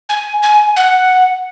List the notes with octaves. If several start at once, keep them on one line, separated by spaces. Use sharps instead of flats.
G#5
G#5
F#5